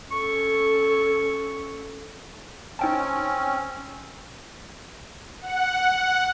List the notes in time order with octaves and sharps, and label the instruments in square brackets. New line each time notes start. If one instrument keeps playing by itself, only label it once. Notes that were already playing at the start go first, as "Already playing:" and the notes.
[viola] C#4 A4 [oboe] C#6
[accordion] C4 C#4 [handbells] D#4 G5 A5
[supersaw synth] F#5